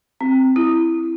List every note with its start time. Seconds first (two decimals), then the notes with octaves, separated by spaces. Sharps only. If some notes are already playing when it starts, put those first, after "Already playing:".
0.21 C4
0.56 E4